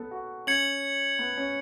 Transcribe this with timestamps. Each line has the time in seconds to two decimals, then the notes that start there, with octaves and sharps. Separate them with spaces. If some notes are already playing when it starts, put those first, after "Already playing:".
Already playing: B3 A4
0.11 F#4
0.47 C#4 G#6 C#7 F#7
1.19 B3
1.37 C#4